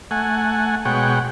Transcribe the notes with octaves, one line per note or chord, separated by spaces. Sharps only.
A3 F#5 G#5
B2 G#3 C#5 F#5 G5